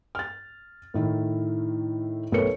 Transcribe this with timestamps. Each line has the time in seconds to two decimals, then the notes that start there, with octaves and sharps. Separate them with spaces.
0.15 F6 A6
0.94 A2 D#3 E4
2.32 B1 A3 A#4 B4 C#5 C#7